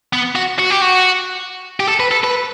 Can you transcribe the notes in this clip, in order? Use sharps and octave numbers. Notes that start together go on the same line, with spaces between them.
B3
F#4
F#4
G4
F#4
G4
A4
B4
A4
B4